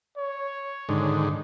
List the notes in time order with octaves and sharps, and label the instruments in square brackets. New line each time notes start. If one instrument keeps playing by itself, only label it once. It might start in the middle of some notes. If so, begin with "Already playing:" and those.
[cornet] C#5
[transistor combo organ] G#2 D3 D#3